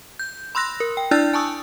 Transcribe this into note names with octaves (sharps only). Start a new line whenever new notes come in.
G6
B5 C6 E6 F#6 A#6
A#4
G5
D4 E4 D5 E6 F#6 A6
G#5 A5 C#6 D#6 E6